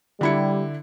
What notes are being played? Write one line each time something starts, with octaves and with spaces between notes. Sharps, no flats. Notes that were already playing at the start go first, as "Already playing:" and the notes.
D3 G3 E4 C#7